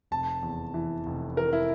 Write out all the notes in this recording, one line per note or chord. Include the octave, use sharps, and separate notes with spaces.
F1 A5
E2
E3
F1
E3 A#4
E4